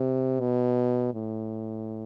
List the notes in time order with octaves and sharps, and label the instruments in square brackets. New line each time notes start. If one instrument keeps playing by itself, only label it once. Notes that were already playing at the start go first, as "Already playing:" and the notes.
Already playing: [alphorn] C3
B2
A2